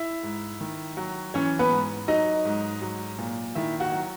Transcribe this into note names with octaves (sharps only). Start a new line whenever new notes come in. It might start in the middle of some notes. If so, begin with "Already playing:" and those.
Already playing: E4 E5
G#2
D#3
F#3
E3 C#4 C#5
B3 B4
G#2
F#3 D#4 D#5
G#2
F#3
A#2
D#3 E4 E5
F#4 F#5
F#3